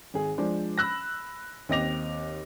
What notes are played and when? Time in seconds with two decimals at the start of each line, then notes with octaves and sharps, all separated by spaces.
0.14 G#1 G#4
0.38 F3 G#3 D4 C5
0.78 B5 E6 F#6 A#6
1.69 D#2 C4 D#5 D6 A#6 F7